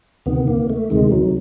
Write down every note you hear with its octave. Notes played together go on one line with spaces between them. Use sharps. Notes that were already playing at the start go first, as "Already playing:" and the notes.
D2 C3 D#3 B3
A#3
A3
D2 C3 D#3 G#3
F#3